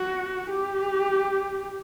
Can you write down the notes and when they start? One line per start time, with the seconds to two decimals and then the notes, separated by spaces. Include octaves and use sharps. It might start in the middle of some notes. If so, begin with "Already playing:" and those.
Already playing: F#4
0.50 G4